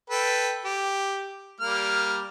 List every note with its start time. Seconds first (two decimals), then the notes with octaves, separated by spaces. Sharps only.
0.10 A4 B4 G5
0.65 G4
1.61 G3 A#3 F6